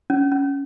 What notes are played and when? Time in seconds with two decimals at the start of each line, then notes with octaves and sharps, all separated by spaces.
0.10 C#4
0.32 C#4